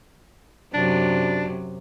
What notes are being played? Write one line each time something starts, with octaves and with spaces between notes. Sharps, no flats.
F#2 C3 F#3 D4